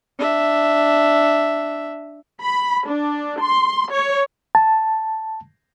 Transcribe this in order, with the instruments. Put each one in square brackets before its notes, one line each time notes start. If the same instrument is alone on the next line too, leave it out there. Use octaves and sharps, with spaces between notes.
[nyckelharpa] D4 E5
[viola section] B5
D4
C6
C#5
[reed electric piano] A5